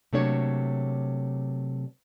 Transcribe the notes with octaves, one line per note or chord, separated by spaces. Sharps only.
C3 F#3 A3 A#3 D4 C#5